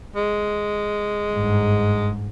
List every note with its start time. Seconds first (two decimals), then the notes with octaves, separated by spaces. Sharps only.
0.16 G#3
1.31 G1 G#2